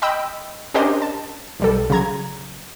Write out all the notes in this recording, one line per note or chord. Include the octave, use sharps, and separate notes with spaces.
D#5 G5 B5 E6
C#4 D4 G4 A#4 C5 D#5
A5
B1 G3 A4
C#3 F#3 A#5 G#6